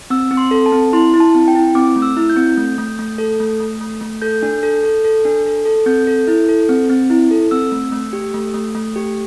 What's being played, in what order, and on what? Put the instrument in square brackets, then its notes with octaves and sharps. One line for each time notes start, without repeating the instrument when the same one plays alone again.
[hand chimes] C4 E6
C4
C6
A4
A5
C4
E4 C6
E4
A5
C4
G5
E4
C4 D6
A3
E6
E4
G6
C4
A3
A3
A3
A4
A3
A3
A3
A3
A4 G6
D4
A4
A4
A4
D4
A4
A4
C4 G6
A4
E4
A4
C4
C4
E4
A4
C4 E6
A3
A3
G4
A3
A3
A3
G4